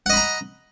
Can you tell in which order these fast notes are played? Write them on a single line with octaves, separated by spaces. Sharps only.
F#5 D#5 B5 A#5